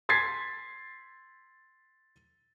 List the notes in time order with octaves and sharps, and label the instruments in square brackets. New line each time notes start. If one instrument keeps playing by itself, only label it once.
[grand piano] C6 G#6 A6 B6 C7